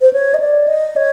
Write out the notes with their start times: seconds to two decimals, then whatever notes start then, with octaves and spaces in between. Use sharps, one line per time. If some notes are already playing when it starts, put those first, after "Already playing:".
0.01 C5
0.13 C#5
0.34 D#5
0.40 D5
0.68 D#5
0.96 C#5